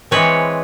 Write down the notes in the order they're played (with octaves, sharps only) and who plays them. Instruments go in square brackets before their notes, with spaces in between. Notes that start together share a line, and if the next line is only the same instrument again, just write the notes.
[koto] E3 G#3 C4 B4 C#5